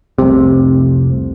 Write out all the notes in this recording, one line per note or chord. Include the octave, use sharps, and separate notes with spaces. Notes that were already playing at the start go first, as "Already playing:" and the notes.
F1 C2 C3